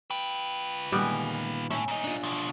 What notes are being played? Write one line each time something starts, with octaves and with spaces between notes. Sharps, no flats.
F4 B4 G5
A#2 D#3 G3 G#3 B3 A4
A2 C#4 G4 E5
A#2 D#5
D4 F4
B2 F3